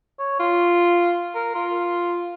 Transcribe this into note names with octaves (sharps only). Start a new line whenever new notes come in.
C#5
F4
A#4
F4